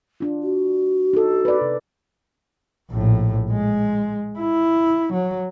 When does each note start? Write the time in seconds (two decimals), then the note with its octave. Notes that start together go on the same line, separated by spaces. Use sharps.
0.20 D4 F4
0.42 F#4
1.13 D#4 A4
1.45 B4 D5
1.61 C3
2.91 A#1 A2
3.51 G#3
4.39 E4
5.13 F#3